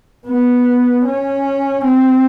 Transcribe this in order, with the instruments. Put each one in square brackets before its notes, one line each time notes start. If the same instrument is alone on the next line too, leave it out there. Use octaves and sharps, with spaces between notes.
[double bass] B3
C#4
C4